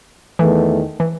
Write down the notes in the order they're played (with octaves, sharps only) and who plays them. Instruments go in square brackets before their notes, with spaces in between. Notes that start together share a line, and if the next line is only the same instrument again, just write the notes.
[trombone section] E2 D#3 A3 [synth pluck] E3
[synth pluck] E3